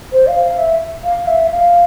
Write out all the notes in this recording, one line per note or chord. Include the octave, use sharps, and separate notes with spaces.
C5
F5
F5
E5
F5
E5
F5